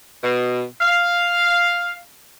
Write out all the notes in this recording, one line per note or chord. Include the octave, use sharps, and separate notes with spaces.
B2
F5